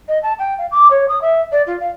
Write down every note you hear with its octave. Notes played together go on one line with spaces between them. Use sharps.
D#5
A5
G5
F5
D6
C#5
D#6
E5
D5
F4
F5